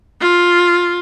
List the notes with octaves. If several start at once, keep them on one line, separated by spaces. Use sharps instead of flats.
F4